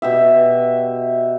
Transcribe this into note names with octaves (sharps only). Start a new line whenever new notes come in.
B2 G4 E5